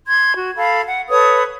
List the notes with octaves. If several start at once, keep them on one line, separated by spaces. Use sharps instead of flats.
C6 G#6
F#4
A4 F5 B5
F#5
A4 B4 C#5 D#6